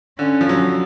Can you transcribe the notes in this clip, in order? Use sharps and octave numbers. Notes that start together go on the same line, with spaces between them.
D3 C#4
F3
F#3